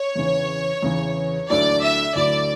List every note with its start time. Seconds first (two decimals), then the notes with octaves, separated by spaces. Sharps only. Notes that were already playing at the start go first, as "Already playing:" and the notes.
Already playing: C#5
0.15 E2 C#3 E3
0.83 E2 C#3 E3
1.49 D2 D3 F#3 A3 E4 D5
1.82 E5
2.15 D2 D3 F#3 A3 E4 D5